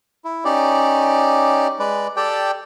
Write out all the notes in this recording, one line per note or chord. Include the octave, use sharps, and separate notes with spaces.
E4
C#4 D#4 G4 D5
G#3 B4 D5
G4 A4 D5 G5